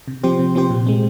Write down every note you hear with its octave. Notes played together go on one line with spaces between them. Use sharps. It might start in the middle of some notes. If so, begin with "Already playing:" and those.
C3
F3 C4 G4 C5
C3
F3 C4 G4 C5
A#2
G#3 C4